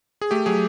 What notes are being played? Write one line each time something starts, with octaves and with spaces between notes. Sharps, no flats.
G#4
A3 G4
F#3 G#4